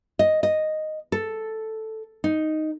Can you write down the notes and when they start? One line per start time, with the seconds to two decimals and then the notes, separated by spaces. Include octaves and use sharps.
0.19 D#5
0.43 D#5
1.12 A4
2.24 D#4